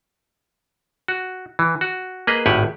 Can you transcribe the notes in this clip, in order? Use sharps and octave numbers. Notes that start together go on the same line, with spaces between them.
F#4
E3
F#4
A#3 G#4 B4 D#5
G#1 A2 G4 F#5 G#5